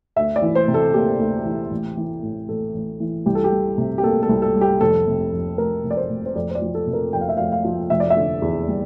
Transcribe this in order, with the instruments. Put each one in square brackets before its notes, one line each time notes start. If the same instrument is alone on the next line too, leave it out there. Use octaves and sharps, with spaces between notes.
[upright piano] D2 E5
D5
E3
C5
C3
A4
A#3 G4
D2
E3
A1
E3
A2
A1 A4
A1
E3
C2 G4
A4
G4
G3
C3
G4
A#3 A4
A4
C2
A4
G3
G4
F1 A4
C3
F2
F1 A#4
F1
D5
C5
C3
C5
F2 D5
C5
D5
F3
A4
C3
A#4
F2 G5
F5
E5
F2 F5
F5
F3
F1 E5
D5
E5
D3
E2
G3